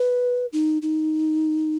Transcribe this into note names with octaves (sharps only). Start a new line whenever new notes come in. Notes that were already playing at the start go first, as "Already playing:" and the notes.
Already playing: B4
D#4
D#4